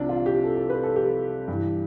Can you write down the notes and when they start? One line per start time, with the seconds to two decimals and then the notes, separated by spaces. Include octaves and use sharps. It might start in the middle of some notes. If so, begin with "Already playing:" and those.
Already playing: C2 C3 F3 D4
0.09 F4
0.26 G4
0.44 A4
0.56 A4
0.70 B4
0.83 A4
0.96 G4
1.48 G2 E3